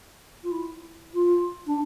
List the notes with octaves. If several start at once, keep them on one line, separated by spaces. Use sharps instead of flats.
F4
E4
F4
D4